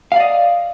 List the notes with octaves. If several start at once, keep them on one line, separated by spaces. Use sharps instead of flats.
D5 D#5 F5